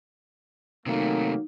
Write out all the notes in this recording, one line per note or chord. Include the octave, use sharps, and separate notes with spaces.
C3 D#3 F#3 A3 A#3 D#4